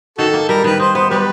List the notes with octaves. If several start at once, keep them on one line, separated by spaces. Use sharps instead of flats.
D#3 F#4 A4
A#3
G3 A#4
D#3 B4
D#4 C5
B3 C5
G3 G4 B4